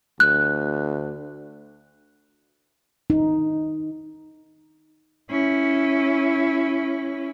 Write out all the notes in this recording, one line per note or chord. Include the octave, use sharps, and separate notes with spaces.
D2 F#6
D#4
C#4 E4